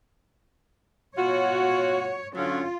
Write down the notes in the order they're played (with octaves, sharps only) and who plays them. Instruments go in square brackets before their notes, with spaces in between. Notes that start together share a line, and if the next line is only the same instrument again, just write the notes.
[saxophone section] B2 F4 F#4 [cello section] C#5
[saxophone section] D3 F#3 C#4 [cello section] F4